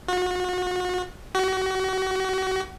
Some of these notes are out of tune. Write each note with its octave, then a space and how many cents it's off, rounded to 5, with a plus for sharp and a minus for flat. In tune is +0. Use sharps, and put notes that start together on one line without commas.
F#4 -35
F#4 +35